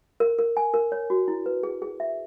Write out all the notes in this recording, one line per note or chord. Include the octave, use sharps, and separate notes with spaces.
A#4
A#4
G#5
A#4
C#5
F#4
E4
B4
G#4
G#4
E5